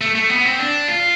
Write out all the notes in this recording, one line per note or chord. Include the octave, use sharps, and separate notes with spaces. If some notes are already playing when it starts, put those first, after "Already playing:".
A3
A3
B3
C4
D4
F4